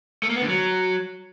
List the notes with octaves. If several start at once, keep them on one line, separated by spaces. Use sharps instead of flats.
A3
A#3
B3
D3
F#3